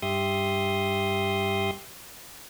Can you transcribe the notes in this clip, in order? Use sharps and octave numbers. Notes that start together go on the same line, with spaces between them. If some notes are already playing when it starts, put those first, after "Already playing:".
G2 G4 E5 C6 D#6